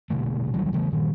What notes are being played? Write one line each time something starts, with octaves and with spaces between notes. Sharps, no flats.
A#1 B2 D3 A3
B1 D#3 F#3 G3
C#3 E3 G3 A3
G2 A#2 D#3